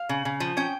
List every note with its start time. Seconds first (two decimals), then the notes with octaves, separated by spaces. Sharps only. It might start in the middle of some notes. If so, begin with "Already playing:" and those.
Already playing: F5
0.09 C#3
0.25 C#3
0.40 F3
0.57 C#4 G5